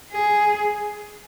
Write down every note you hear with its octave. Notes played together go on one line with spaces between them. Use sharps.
G#4